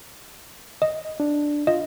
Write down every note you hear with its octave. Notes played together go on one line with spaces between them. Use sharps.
D#5
D4
F4 D#5